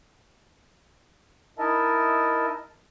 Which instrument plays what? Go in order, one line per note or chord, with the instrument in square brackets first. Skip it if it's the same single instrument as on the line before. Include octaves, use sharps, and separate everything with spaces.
[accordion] D#4 E4 A#4 D#5 E5 A5